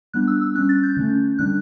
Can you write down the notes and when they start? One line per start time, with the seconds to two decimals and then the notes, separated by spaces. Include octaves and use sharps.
0.13 G3 B3 D4 F#6
0.27 E6
0.41 E6
0.55 G3 C#4 F#6
0.69 A6
0.83 G6
0.97 D3 A3 C#4
1.38 D3 G3 D4 F#6